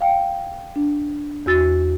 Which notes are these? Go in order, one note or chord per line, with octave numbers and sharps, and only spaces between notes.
F5 G5
D4
E2 F#4 E6 A6